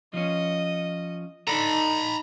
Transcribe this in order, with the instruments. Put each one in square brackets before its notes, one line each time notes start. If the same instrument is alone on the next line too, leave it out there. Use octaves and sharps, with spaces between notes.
[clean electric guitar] F3 C#4 [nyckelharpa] D#5
[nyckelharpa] D#4 [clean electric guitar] A4 D5 [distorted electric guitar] A#5 B5